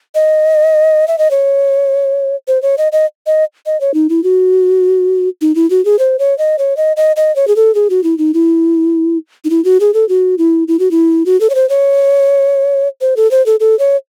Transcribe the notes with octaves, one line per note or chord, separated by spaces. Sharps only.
D#5
E5
D#5
C#5
C5
C#5
D#5
D#5
D#5
D#5
C#5
D#4
E4
F#4
D#4
E4
F#4
G#4
C5
C#5
D#5
C#5
D#5
D#5
D#5
C#5
G#4
A4
G#4
F#4
E4
D#4
E4
D#4
E4
F#4
G#4
A4
F#4
E4
E4
F#4
E4
F#4
A4
C#5
C5
C#5
C5
A4
C5
A4
A4
C#5